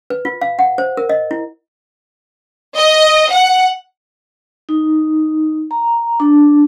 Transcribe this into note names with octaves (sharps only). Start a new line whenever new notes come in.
B4
F4
F5
F#5
C5
A#4
D#5
E4
D#5
F#5
D#4
A#5
D4